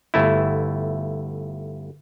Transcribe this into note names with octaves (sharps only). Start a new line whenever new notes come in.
G1 A3 E4